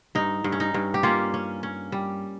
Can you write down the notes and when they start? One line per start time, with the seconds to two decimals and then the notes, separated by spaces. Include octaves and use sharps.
0.15 G2 D#4
0.44 G2
0.52 C#4
0.60 D#4
0.74 G2
0.94 G4
1.03 A#3 C#4 F4
1.34 C#4
1.63 C#4
1.92 G3